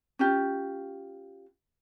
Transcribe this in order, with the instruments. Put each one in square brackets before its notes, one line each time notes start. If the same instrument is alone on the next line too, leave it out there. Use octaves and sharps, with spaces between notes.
[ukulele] C#4 F4 G4